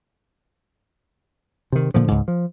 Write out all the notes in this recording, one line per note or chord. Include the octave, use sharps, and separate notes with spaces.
C3 D#3
A#2 D3 F3
C#2 G#2
F3